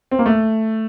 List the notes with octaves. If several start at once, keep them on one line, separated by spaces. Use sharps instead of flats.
C4
A#3
A3